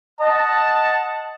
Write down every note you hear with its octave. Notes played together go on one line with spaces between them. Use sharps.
D#5 F#5 A5